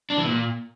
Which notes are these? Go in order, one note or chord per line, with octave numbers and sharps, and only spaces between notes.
D4
E3
A#2